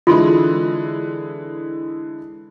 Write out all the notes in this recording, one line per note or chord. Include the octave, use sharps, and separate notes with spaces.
D3 E3 G#3 F4 C6